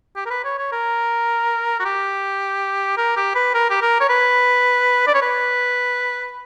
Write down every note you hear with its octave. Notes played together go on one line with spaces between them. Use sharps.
G4
A#4
B4
C#5
C#5
A#4
F#4
G4
A#4
G4
B4
A#4
G4
A#4
C#5
B4
D5
C#5
B4